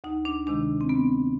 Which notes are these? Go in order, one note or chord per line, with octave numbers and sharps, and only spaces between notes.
D2 D#4
D4
C3 D#3 G#3 D4
C4
B3